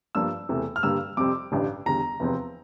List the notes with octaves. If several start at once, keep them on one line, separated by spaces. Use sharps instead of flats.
G2 F3 A#3 D4 E6
E1 E2 C3 E3 A3
F6
G2 D3 G3 A#3 E6
F2 C3 G3 C4 D6
A1 G2 D3 G3
E2 D3 G3 A#5
F1 E2 C3 F3 C4